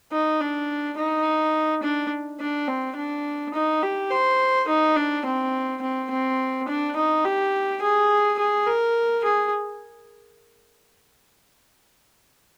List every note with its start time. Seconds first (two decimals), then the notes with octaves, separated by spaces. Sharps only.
0.12 D#4
0.40 D4
0.97 D#4
1.83 D4
2.40 D4
2.68 C4
2.96 D4
3.54 D#4
3.82 G4
4.11 C5
4.68 D#4
4.96 D4
5.25 C4
5.82 C4
6.10 C4
6.68 D4
6.96 D#4
7.25 G4
7.82 G#4
8.39 G#4
8.67 A#4
9.24 G#4